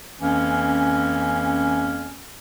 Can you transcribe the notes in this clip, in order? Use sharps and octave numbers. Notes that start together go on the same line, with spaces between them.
F2 E3 A#3 C#4